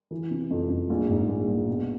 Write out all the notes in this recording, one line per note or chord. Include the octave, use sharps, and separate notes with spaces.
E3
C3
F2
F2
A#1
G#2
A#1
A#1
B2